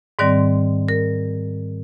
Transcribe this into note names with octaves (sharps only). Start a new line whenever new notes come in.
G#2 D#3 G3 C4 D5
A#4